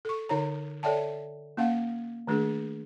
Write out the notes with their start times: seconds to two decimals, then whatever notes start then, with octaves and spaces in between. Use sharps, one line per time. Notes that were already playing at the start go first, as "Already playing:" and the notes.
0.05 A4 C#6
0.29 D3 D#4 C#5 A#5
0.83 A4 C#5 D5 E5 G5 A5
1.57 A#3 C#4 F5 F#5
2.27 D#3 A3 D4 G#4